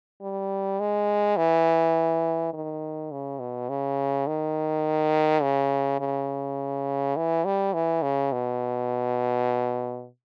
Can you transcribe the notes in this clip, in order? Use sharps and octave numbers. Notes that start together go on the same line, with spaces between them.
G3
G#3
E3
D#3
C#3
B2
C#3
D#3
C#3
C#3
E3
G3
E3
C#3
B2